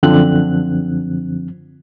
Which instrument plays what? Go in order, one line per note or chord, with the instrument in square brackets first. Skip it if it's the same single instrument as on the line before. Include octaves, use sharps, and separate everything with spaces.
[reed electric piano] F#2 D3 F3 C4 F#6